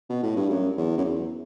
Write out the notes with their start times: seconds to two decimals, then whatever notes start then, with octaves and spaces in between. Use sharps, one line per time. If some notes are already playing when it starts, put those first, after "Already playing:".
0.09 B2
0.23 A2
0.36 G2
0.49 F#2
0.77 E2
0.98 F#2
1.05 E2